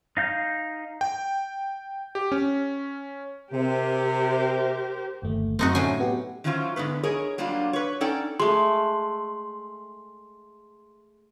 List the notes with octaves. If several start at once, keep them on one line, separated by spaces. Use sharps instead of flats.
D#4 F5 G6
G5
G4
C#4
C3 G4 A#4 C5
G1 D#2 A3
F#2 C4 D#4 F#4
A2 C3 F#3 C#4 G#5 C7
B3 F#4 G4
D#3 E3 F#3 C#4 F4 C5
G#2 D3 B3 B4
G#4 A#4 C#5 D#5
F#3 G3 A#3 D4 F4
B4 C#5
C#4 D#4 A4 D5 F#5 G5
G#3 A3 C6